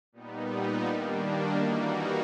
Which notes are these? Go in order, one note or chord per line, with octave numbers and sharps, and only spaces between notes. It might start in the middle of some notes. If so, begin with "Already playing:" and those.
A#2 G3 B3 D#4
D#3 G3 A#3 D4
E3 G3 A#3 D#4 F#4